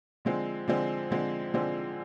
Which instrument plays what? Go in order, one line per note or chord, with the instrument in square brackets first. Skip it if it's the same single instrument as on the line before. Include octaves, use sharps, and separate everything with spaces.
[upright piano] D3 F3 G#3 C4
D3 F3 G#3 C4
D3 F3 G#3 C4
D3 F3 G#3 C4